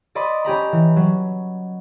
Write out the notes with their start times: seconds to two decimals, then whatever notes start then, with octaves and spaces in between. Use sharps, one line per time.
0.15 D5 D#5 B5 C6
0.44 C#4 G4 A#5 B5
0.72 E3
0.96 F#3